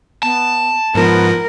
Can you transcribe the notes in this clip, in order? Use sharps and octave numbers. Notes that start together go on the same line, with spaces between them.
B3 A5
G#2 F3 B3 A#4